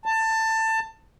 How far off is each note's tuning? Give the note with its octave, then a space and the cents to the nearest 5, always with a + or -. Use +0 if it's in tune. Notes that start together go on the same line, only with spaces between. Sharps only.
A5 +20